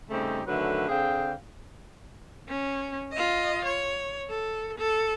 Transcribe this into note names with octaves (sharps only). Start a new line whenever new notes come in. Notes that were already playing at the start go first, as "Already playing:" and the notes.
C#3 G3 A3 C4 D#4 G4
D3 D#3 F#3 A3 C#4 B4
D3 C4 G#4 F5 G5
C#4
F4 D#5
C#5
A4
A4